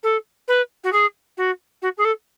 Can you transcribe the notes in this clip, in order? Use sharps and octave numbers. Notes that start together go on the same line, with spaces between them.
A4
B4
F#4
G#4
F#4
F#4
G#4
A4